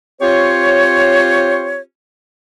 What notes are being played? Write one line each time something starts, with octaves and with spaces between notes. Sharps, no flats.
C4 F4 G4 C5 C#5